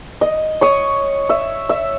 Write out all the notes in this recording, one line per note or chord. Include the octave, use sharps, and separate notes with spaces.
D#5
C#5 D#6
E5
E5